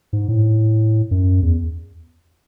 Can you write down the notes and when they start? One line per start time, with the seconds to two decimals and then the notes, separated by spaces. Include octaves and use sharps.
0.13 G#2
0.29 A2
1.11 F#2
1.42 E2